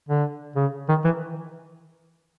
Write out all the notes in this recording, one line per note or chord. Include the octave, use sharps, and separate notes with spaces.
D3
C#3
D#3
E3